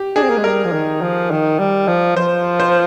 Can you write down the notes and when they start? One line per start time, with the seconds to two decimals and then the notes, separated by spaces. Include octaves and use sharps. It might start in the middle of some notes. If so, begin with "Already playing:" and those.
Already playing: G4
0.16 D4 G#4
0.23 C4
0.30 A#3
0.37 G#3
0.44 G3 A#4
0.65 F3
0.73 D#3
1.01 F3
1.31 D#3
1.59 G3
1.88 F3
2.16 F3 C5
2.60 C5